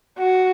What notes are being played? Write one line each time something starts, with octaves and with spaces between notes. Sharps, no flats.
F#4